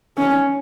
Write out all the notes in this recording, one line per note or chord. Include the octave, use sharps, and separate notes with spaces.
C#4